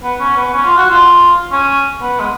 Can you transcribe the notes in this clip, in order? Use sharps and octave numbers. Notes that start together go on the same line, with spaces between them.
B3
C#4
B3
C#4
F4
F#4
F4
C#4
B3
G#3